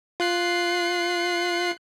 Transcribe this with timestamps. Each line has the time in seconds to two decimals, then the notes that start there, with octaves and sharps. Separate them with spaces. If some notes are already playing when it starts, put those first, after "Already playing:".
0.20 F4 F#6 C7